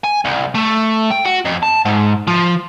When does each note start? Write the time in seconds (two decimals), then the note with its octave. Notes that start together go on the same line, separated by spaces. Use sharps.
0.04 G#5
0.25 C2
0.55 A3
1.12 G5
1.25 F#4
1.45 F2
1.63 A5
1.85 G#2
2.27 F3